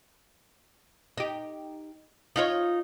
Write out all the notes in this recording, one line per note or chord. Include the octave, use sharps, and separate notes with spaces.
D#4 G4
D#4 F4 C#5